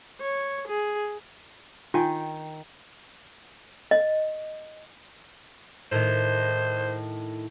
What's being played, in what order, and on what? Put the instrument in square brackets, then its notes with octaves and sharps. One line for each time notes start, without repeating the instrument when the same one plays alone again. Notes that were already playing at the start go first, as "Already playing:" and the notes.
[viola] C#5
G#4
[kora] D#3 G5 [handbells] F4 G#5
[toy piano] D#5
[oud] A2 D#3 [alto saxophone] C5